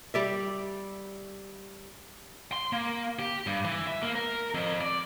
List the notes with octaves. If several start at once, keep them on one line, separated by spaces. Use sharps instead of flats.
G3 D5 E5
C6
A#3
G4
G2
E3
E5
A#3
A#4
F2
D5